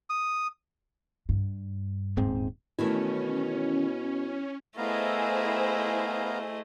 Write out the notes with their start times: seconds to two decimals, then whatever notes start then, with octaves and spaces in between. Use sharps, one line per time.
0.10 D#6
1.29 G2
2.17 D#1 G#2 C4
2.79 B2 D#3 E3 A3 C#4 E4
4.77 A3 B3 E4 G#4 C5 D#5 F5 A#5